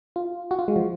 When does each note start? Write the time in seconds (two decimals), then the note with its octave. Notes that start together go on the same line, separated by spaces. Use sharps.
0.16 F4
0.51 F#4
0.59 F4
0.68 G#3
0.76 F3